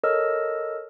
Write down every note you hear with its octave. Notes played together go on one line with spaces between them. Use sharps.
A4 A#4 C#5 D#5 E6 F6